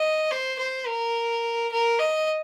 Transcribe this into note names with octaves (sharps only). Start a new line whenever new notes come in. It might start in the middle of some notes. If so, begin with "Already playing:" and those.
Already playing: D#5
C5
C5
A#4
A#4
D#5